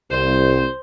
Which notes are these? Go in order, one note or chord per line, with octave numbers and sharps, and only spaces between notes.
C2 C5